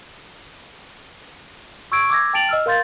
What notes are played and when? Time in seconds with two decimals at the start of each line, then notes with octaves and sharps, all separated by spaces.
1.92 C#6 E6 G#6 D7
2.10 D6 E6 G#6 A#6
2.33 G5 A5 A6 D7 F7 F#7
2.49 D#5 E6 F6
2.66 A#4 F5 C6 G6 A6